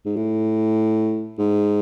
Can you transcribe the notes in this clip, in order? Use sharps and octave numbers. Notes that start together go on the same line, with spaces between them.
G#2
A2
G#2